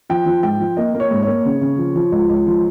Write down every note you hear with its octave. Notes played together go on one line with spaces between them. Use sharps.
F3 G5
F3
G#2 G5
F3
A#3 D#5
A#3
C#5
G#2
C#5
A#3
C#3
C#3
F3
F3
C#2
C#2
F3